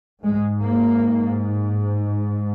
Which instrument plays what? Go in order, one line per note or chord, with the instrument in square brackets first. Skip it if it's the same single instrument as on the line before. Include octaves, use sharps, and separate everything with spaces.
[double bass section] G#2 G#3
A#3